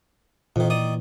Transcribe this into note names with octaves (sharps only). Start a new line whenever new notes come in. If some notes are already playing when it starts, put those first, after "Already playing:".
F2 A#2 D#3 E3
D#3 D5 D#6